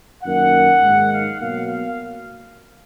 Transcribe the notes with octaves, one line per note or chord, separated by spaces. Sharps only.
F#2 D#3 A#3 F#5
G#2 D#3 G#3
F5
B2 F#3 A#3 F5
F5